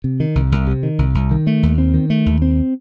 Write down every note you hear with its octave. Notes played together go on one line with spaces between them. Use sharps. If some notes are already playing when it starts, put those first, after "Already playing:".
C3
D#3
C2
C2
C3
D#3
C2
C2
D#3
A3
D#2
C4
D#3
A3
D#2
C4